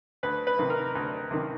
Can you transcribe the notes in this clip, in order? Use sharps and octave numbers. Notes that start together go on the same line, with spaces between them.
D2 B4
B4
C3 D#3
A#4
D2
C3 D#3